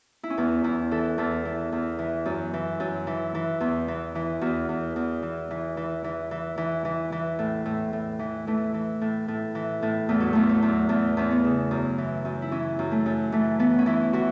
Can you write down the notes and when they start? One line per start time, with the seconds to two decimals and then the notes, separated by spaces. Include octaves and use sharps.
0.23 E4
0.30 C#4
0.38 E2 B3
0.64 E2 E4
0.91 E3 A4
1.18 E2 A4
1.45 E3
1.72 E2
1.99 E3
2.26 F#2
2.53 E3
2.80 F#2
3.07 E3
3.35 E3
3.60 E2
3.88 E3
4.15 E3
4.41 E2 F#4
4.69 E2
4.96 E2
5.23 E3
5.51 E3
5.77 E3
6.04 E3
6.31 E3
6.57 E3
6.85 E3
7.12 E3
7.39 A2
7.66 A2
7.93 A2
8.19 E3
8.47 E3 A3
8.74 E3
9.01 A2
9.28 A2
9.55 E3
9.82 A2
10.09 E2 A3
10.21 F#3
10.33 E2 A3
10.49 F#3
10.62 E2
10.89 E2 A3
11.17 E2 C#4
11.31 B3
11.44 C#3
11.71 F#2
11.98 E3
12.25 F#2
12.42 E4
12.51 E3 C#4
12.79 F#2
12.92 A3
13.06 F#2
13.32 E3 A3
13.59 E3 B3
13.79 C#4
13.86 E3 E4
14.13 E3 F#4